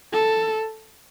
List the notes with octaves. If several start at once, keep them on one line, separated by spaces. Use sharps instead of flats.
A4